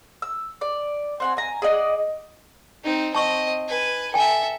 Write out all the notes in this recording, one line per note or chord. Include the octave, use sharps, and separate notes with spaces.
E6
D5
C4 F#5 G#5
G#5 A#5
G#4 D5 D#5 F#5
C4 D#4
C4 D#5 A5 C#6
B4 G#5
A4 E5 G5 G#5